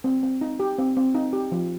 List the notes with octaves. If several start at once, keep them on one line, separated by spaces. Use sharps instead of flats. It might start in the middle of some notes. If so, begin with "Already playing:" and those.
C4
C4
D#4
G4
C4
C4
D#4
G4
F3